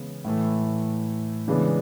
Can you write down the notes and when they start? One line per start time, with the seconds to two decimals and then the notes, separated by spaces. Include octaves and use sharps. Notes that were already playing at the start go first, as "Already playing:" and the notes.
Already playing: C#3 E3 G#3 B3
0.25 A2 E3 A3
1.48 C#3 E3 G#3 B3 D4